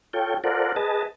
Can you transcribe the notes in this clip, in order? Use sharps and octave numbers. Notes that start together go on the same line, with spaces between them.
F4 A4 C#5 G5
F4 A4 A#4 C5 D5 F#5
G#4 B4 D#5 A5